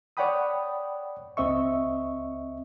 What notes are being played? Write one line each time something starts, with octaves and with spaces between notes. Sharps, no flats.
C#5 D5 F#5 G5 B5 D#6
C#2 C4 D#5 E5 C#6